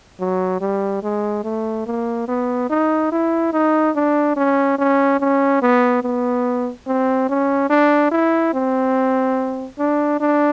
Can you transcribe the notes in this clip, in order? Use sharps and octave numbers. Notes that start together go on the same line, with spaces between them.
F#3
G3
G#3
A3
A#3
B3
D#4
E4
D#4
D4
C#4
C#4
C#4
B3
B3
C4
C#4
D4
E4
C4
D4
D4